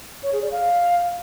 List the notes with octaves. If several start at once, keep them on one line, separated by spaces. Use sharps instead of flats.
C#5
G#4
D5
F5